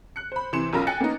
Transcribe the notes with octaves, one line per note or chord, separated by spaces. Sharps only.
F#6 C#7
C5 B5
C3 E3 C6 C#7 E7
B1 C#4 F4 A#4 B5 A#6
G5 G#5 F#6 A6 C#7
A#3 B3 C#4 D#4